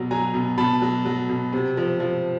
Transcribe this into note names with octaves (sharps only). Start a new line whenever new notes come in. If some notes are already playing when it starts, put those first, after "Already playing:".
Already playing: B2 F#3
F#3 G#5 A#5
B2
B2 A5 B5
F#3
F#3
B2
C3
F3
F3